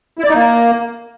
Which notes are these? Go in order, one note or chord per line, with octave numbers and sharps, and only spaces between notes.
E4
D5
D#4
A#3